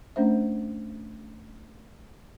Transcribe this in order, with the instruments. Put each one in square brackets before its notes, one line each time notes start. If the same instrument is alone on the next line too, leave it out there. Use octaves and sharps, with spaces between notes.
[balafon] A3 C#4 D4 C5 E5